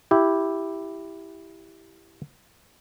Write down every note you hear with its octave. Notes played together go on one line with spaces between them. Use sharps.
E4 G4